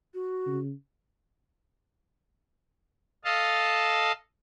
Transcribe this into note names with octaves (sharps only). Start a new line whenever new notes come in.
F#4
C#3
A4 D#5 F5 A5